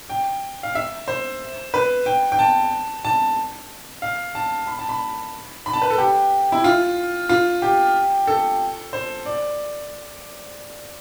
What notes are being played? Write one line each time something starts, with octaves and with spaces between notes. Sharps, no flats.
G5
F5
E5
C5
B4
G5
G5
A5
A5
F5
A5
B5
A5
B5
B5
A5
B4
A4
G4
E4
F4
F4
G4
A4
C5
D5